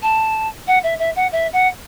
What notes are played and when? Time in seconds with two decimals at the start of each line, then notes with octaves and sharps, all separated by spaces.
0.02 A5
0.67 F#5
0.83 E5
0.99 E5
1.16 F#5
1.32 E5
1.53 F#5